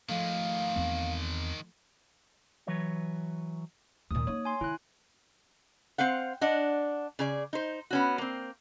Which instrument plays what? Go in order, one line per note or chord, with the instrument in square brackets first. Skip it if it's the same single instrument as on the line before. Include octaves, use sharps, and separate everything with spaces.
[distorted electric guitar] D#3 G#3 [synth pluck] F3 A3 [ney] F5
[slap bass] E2 B3 C4
[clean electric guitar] E3 F#3 B4 C#5
[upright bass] D#2 A#2 [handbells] D#6
[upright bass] A#3 D#4 [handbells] C#5
[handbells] G#5 C6
[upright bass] D#3 [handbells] E4 F#6
[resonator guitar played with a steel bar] C4 C5 F5 F#5
D4 D#5 F#5
C#3 G#4 D5
D#4 C5
B3 C#4 F#4
A#3 C4